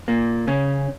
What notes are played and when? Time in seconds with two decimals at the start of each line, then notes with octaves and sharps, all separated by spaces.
0.08 A#2 A#3
0.48 C#3 C#4